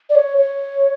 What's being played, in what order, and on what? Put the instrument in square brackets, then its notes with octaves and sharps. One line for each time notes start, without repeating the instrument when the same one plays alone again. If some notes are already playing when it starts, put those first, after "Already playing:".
[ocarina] D5
C#5
C#5